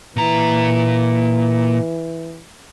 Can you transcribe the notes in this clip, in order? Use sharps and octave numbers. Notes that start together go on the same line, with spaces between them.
A#2 E3 A#5